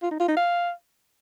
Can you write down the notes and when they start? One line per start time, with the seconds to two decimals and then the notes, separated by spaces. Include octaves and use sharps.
0.03 F4
0.11 D#4
0.20 F4
0.28 D#4
0.37 F5